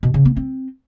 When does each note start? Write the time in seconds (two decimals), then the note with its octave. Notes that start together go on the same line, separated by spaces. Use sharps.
0.03 B2
0.14 C#3
0.25 B3
0.37 C4